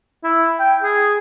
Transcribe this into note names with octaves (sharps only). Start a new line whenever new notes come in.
E4
G5
G#4